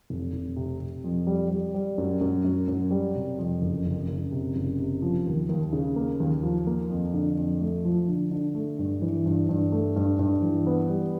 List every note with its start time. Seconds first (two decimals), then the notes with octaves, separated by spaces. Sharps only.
0.10 F1
0.33 F1
0.56 C3
0.80 C3
1.04 F2
1.27 G3
1.50 G3
1.74 G3
1.98 F#2
2.21 F#2
2.45 F#2
2.68 F#2
2.91 G3
3.15 C3
3.38 F2
3.62 F#1
3.86 F#1
4.08 F#1
4.32 C3
4.56 F#1
4.79 C3
5.02 F3
5.27 D#2
5.49 D#2
5.73 C#3
5.96 A#3
6.20 D#2
6.43 F3
6.67 A#3
6.90 F2
7.14 D3
7.37 F2
7.61 A3
7.85 F3
8.08 D3
8.31 D3
8.55 A3
8.79 G2
9.02 E3
9.26 G2
9.49 G2
9.72 A3
9.96 G2
10.19 G2
10.42 E3
10.67 B3
10.89 G3